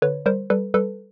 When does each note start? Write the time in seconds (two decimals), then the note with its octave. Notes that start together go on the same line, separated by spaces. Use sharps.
0.02 D3 B4 C#5
0.26 G3 A#4 C5
0.50 G3 A4 B4
0.74 G3 A4 B4